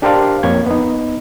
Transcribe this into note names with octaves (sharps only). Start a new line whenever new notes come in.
D4 G4 A#4 C5 D5 F5
F2 A#3 C#5 G#6
B3 D#4